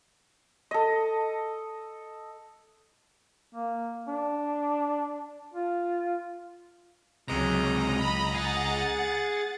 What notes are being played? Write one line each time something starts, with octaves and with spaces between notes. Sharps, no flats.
A4 D#5
A#3
D4
F4
C#2 C3 F#3 G#3 D#5 A#5
B5
G#4 F#5 A6